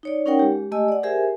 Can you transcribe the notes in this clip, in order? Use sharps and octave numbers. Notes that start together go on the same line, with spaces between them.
D#4 C#5 D5
C#4 D#4 A#4 C#5 F#5 G5
G#3 G4
A3 G4 D#5 G#5 E6
D5 F#5
G4 G#4 A#4 C5 E5 G#5